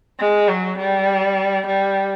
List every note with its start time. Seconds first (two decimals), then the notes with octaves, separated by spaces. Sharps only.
0.19 G#3
0.48 F#3
0.78 G3
1.67 G3